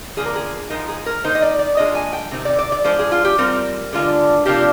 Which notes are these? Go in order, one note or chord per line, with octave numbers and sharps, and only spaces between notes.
D3 F3 A#3 G#4
A#4
G#4
F3 G#3 D#4 A#4
G#4
A#4
D#3 A#3 D#4 C5
D#5
D5
D5
A#2 G#3 D4 F4 D#5
G#5
G5
C3 D#3 C4
D5
D5
D5
F3 G#3 D4 C5
G#4
F4
G4
G3 C4 F4 A#4
D3 G#3 D4 F4
C3 F3 A#3 D4 F4 G4